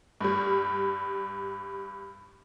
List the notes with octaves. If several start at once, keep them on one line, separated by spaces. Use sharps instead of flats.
G2 G3